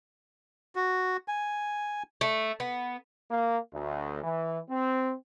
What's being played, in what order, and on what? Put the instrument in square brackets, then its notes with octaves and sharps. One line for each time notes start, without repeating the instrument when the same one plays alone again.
[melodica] F#4
G#5
[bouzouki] A3
B3
[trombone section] A#3
D2
E3
C4